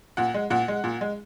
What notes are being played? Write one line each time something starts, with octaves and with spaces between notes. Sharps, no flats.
A#2 F#5
G#3
A#2 F#5
G#3
A#2
G#3